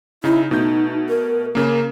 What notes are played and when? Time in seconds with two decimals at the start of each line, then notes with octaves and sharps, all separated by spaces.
0.24 C#3 D#4 E4
0.51 B2 A3 D#4 G6
1.09 A#4
1.55 C#3 A#3 A#4